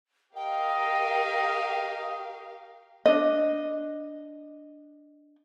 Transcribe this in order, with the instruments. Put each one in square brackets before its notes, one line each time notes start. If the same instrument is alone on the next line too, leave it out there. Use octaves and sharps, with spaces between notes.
[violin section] G4 A#4 F5 [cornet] D#5 [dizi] G5
[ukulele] D4 D#5